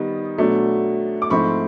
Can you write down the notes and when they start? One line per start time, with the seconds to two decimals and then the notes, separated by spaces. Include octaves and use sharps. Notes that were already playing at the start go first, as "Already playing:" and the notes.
Already playing: D#3 G3 B3 D#4
0.38 B2 F#3 A3 D4
1.22 D6
1.30 G#2 F3 A3 C4 E4 B5 C#6